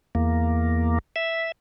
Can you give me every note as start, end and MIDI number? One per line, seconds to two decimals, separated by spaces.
0.15 0.99 40
0.15 0.99 58
1.16 1.52 76